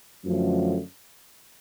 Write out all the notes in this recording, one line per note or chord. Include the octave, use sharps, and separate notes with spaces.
F#2 D3 F3 A3 C#4